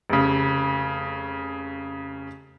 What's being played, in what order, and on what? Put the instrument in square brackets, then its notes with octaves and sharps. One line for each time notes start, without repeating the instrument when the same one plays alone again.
[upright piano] F1 C#3